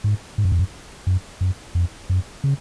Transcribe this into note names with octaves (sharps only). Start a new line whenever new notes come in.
G#2
G#2
F#2
F2
F#2
F#2
F#2
F2
F#2
C#3